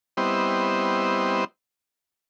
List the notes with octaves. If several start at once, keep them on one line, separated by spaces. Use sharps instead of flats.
G3 B3 C4 E4 C5 D#5